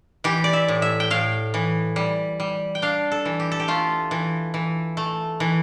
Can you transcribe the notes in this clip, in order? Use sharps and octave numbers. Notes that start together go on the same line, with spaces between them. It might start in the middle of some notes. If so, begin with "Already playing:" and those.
E3 G4
D5
E5
A2
E5
G5
A2 F5
E3
G3
G3
G5
D4 F5
A4
E3
G4
A4
G4
A3 F4
E3
E3
A3
E3